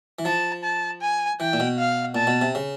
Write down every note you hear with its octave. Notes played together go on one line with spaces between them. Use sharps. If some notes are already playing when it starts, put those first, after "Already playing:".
E3
F3 A5
A5
G#5
E3 G5
A#2
B2
F5
A#2 A5
B2
C3
C#3